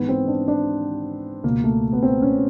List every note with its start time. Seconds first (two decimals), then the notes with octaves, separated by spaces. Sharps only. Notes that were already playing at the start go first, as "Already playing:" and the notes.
Already playing: G#2 E3 B3
0.09 C4
0.28 D4
0.48 D4
1.44 C#2 B2 A#3
1.64 A3
1.93 B3
2.03 C4
2.22 C#4